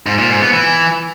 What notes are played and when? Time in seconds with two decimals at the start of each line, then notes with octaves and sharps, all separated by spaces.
0.06 G#2
0.18 A#2
0.30 G#2
0.42 B3
0.53 E3